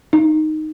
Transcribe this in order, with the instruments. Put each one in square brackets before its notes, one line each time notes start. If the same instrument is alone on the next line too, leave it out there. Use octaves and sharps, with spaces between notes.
[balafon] D#4